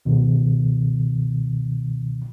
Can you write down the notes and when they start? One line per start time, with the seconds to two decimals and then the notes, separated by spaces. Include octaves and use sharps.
0.05 C#2 B2 D#3